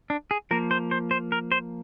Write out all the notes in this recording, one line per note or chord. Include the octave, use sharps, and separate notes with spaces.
D4
G#4
F3 A#3 A#4
C5
C5
C5
A#4
C5